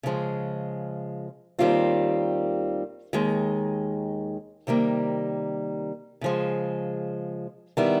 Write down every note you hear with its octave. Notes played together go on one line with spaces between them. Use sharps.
C#3 F3 G#3
D#2 D#3 G3 C4 F4
D#2 D#3 G#3
C3 D#3 G3 A#3
C#3 F3 G#3
D#3 G3 B3 E4